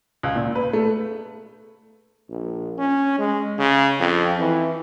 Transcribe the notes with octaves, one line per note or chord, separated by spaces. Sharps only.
C#2
A#2
B4
A3
A#1
C#4
G#3
C#3
F2
E3